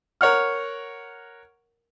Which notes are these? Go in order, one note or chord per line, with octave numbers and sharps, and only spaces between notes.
A#4 C#5 F#5 F6